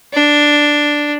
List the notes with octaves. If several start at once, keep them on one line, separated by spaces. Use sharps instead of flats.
D4